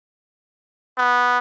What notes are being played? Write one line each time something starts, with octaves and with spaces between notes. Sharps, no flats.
B3